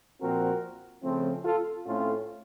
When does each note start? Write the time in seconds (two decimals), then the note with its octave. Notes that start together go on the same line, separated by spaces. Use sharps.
0.22 A#2 F3 C4 F#4 A#4
1.03 C#3 F3 A3 C4
1.44 F4 A4
1.85 A2 A3 C4 C#4 F4